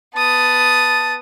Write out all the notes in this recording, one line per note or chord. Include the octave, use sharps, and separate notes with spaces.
B3 A5 D#6